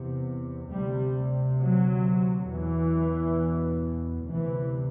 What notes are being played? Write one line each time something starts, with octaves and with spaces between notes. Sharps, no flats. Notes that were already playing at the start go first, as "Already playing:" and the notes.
Already playing: E2 C3
D2 C3 G3
F#3
E2 B2 E3
D2 C3 E3